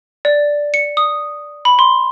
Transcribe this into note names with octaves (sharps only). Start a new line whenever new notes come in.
D5
C#7
D#6
B5
C6